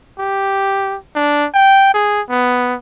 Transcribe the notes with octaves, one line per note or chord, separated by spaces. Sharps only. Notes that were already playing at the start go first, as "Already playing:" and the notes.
G4
D4
G5
G#4
B3